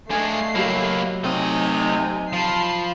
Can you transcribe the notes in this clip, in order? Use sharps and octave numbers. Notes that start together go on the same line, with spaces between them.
G#3 A3 D4 D#5 F5 G#5 C7
F#3 A#3 E4 G4
C3 A3 D#4 D#5 G#5
F3 F5 A5 B5 C7